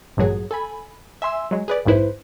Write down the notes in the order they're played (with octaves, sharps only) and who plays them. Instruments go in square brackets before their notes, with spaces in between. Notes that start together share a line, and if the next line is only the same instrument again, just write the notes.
[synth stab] A1 G2 A#2 F#3 G#4
A4 G#5 B5
E5 G#5 C6 E6
F#3 G#3
G#4 B4 D5
A#1 F2 G#2 E4 B4 C5